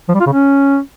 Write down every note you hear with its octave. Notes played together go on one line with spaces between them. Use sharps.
F3
G3
F4
C#3
C#4